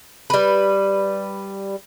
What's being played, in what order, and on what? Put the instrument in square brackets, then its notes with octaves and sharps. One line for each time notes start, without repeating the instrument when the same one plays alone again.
[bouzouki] G3 B4